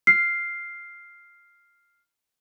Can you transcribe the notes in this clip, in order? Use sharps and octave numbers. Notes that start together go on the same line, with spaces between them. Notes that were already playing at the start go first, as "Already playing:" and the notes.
F6 C7